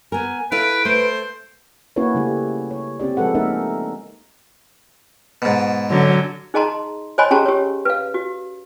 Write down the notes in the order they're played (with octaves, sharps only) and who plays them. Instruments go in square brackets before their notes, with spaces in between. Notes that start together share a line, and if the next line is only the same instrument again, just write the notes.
[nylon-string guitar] B3 A#4 [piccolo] G#5
[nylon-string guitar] E4 A4 F5 [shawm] B4 [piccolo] D7
[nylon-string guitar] A3 [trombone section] B4 [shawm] C5
[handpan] A#3 C#4 E4 F#4 B4 C#5
C#3 G3 A3 E4 G4
C#5
C4 C#4 G4 D5
F3 G#3 A4 B4 F#5
A3 A#3 C#4 D#4 A#4 E5
[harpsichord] G#2 B2
[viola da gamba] D3 F#3 C#4
[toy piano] D#4 G#4 D#5 A5 A#5 C6
C5 C#5 D#5 G#5 B5 C6
C#4 G4 G#4 A5 A#5 C6
G4 C#5
B4 F5
F#4